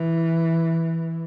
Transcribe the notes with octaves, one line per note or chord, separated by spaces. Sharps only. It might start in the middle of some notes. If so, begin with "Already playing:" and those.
Already playing: E3